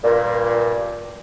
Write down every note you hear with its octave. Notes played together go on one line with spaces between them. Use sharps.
G2 A#2